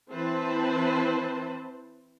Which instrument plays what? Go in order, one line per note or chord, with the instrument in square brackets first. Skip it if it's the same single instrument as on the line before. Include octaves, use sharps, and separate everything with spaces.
[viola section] E3 C4 B4 C5 A5